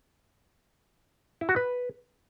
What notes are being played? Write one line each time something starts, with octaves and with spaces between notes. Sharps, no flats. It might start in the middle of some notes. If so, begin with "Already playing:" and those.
E4
F#4
B4